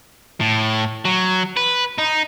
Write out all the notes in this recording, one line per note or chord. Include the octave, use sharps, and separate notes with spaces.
A2
F#3
B4
D#4